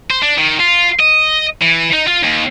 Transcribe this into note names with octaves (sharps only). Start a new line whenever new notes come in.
C5
D4
D#3
F4
D#5
E3
D#4
F4
D#2